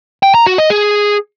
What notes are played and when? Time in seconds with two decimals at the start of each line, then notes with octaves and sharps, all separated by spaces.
0.23 G5
0.35 A#5
0.46 F#4
0.58 D#5
0.70 G#4